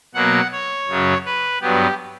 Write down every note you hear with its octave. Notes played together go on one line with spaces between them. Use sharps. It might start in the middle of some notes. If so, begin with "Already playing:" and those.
B2 F#3 A#3 F#5
C#5
F#2 C#3 F#3
B4
G2 F#3 B3 G4